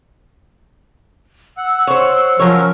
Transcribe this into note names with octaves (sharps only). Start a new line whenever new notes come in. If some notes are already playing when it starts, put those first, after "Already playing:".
F#5 E6
C5 C#5
F3 F#3 C#4 A#4 C#5